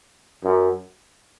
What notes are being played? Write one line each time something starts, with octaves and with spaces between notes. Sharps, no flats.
F#2